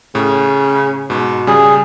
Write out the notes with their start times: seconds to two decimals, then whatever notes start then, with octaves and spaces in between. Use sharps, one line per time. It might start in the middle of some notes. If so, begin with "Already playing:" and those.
0.15 A2 C#3
1.10 G#2 B2
1.47 C#3 G3 G#4